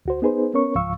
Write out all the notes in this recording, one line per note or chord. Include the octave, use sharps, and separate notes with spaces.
D2 F#4 C5
B3 D#4 G#4 B4 C5
B3 C#4 A#4 C#5 C#6
C#2 G#2 F3 F5 C#6 E6